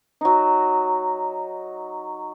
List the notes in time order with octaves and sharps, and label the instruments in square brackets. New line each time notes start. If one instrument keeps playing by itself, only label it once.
[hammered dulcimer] F#3 D#4